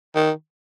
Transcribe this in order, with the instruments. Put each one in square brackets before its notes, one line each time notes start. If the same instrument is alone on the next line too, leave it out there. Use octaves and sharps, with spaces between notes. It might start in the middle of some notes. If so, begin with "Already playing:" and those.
[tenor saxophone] D#3